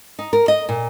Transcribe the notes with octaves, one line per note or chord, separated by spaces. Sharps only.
D#4
A#4
D#5
A#2